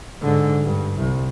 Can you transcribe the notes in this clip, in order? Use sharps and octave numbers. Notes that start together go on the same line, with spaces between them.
G#2 D3
G2
C2